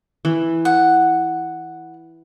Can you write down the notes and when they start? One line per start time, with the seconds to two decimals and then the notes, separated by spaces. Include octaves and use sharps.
0.25 E3
0.65 F#5